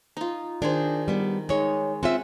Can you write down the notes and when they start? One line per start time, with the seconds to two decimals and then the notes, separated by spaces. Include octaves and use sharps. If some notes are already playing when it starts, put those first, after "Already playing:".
0.17 D#4 F4
0.62 D#3 D4 G#4 C5
1.08 G3 B3
1.49 G#3 D#4 C#5
2.03 C4 C#4 F4 E5 F#5